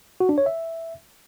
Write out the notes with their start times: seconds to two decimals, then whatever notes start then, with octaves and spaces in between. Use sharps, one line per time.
0.20 F#4
0.29 D4
0.38 C#5
0.46 E5